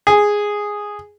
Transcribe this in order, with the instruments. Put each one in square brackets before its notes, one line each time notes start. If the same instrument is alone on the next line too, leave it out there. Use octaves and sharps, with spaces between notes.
[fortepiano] G#4